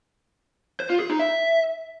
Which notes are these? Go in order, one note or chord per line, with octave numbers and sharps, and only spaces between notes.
C5
F4
G#4
D#4
E5